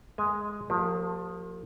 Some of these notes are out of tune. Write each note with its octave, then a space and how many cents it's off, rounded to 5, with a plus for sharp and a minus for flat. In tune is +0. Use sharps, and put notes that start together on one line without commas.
G#3 +0 G#5 +0
F3 +25 A#3 -35 G4 +5